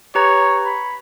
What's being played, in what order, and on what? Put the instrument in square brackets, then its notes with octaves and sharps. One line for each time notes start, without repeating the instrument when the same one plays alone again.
[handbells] G4 B4 A#5 [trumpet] C#5
[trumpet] B5